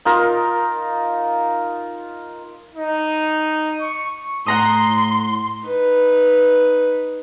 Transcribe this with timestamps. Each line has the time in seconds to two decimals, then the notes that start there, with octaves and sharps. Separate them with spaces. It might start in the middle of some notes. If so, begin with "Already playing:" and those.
0.05 D#4 F4 A#4
2.75 D#4
3.81 C#6
4.46 A2 F#5 A#5 C6 D#6
5.67 D#4 B4